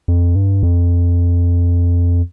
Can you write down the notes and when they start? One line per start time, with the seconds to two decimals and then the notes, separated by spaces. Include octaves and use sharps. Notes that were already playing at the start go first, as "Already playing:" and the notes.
0.08 F2
0.35 G2
0.63 F2